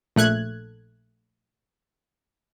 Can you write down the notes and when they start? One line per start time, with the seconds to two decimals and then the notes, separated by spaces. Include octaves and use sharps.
0.16 A#1 A3 F#6 G#6